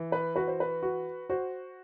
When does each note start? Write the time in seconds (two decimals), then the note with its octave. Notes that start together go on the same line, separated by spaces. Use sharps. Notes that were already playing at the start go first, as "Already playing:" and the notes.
Already playing: E3
0.12 B4
0.36 F#4 B4
0.48 C5
0.60 B4
0.82 F#4
1.30 F#4 C5